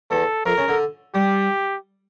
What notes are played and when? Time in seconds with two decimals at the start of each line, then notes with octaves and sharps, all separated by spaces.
0.11 E2 A4
0.46 F2 A#4
0.58 C#3
0.68 D3
1.14 G3 G4